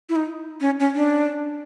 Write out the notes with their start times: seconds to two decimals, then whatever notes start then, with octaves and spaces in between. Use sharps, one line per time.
0.09 E4
0.16 D#4
0.61 C#4
0.80 C#4
0.95 D4